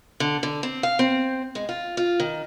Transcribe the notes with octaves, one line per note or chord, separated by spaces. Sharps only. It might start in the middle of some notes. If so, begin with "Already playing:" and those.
D3
D3
C4
F5
C4
G#3
F4
F4
D#3